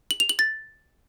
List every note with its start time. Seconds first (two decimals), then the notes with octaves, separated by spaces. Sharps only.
0.11 F#7
0.20 F7
0.29 F#7
0.39 A6